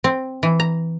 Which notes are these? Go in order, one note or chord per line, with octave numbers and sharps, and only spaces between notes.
C4
E3
A#5